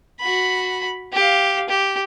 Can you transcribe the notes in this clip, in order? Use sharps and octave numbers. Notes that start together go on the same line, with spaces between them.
F#4 B5
G4 F5
G4